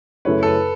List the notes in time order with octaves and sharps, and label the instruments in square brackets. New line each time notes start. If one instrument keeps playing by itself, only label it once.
[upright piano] F#2 C#3 A3 E4 C#5 [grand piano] B4
[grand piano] A4
B4